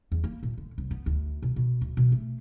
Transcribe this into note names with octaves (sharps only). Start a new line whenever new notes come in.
E2
A#3
A#2
D3
C2
B3
D2
B2
B2
D2
B2
A3